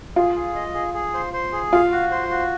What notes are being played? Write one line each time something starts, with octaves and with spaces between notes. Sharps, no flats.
F4 G#4
G#4
D#5
G#4
G#4
C5
C5
G#4
F4 F5
F#4
C5
F#4